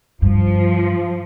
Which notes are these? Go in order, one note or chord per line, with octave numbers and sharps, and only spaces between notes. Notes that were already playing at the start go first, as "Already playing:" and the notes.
G2 F3